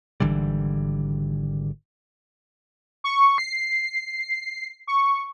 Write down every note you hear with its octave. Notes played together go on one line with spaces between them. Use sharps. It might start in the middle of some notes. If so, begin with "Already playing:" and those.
G#1 D3 E3 G3
C#6
C7
C#6